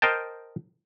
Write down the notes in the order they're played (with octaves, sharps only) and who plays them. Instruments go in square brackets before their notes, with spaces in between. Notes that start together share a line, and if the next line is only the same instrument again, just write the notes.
[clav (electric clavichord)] A#4 C5 D#5 G5 A5